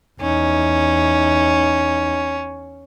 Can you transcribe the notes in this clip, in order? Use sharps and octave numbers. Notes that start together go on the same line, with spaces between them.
E2 C#4 D#4